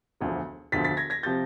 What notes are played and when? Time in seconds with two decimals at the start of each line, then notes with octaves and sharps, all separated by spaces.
0.21 E1 D2 D3 F3
0.72 E1 D2 D3 F3 A6 B6
0.84 A6 B6
0.97 G#6 A#6
1.10 G#6 A#6
1.23 C3 F3 G6 A6